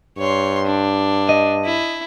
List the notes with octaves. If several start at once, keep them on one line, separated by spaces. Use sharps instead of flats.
G2 C#5 C6
D4
D#5
E4